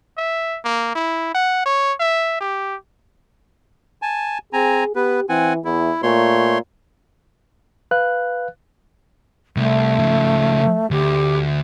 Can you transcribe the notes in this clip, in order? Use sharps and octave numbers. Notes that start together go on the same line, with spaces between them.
E5
A#3
E4
F#5
C#5
E5
G4
G#5 A5
C4 G#4 G#5 A#5
B3 G4 B4
E3 C4 F#5 G#5
E2 E4
A#2 A3 C#5 C6
B4 F5 F#6
C2 A3
C#3 F3
D2 G4